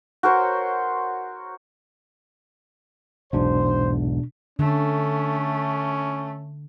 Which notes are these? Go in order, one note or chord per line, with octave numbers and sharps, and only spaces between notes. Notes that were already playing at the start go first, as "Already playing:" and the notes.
F#4 A#4 C5 C#5
B1 E2 G#2 B2 D4 C5
D3 A3 C#4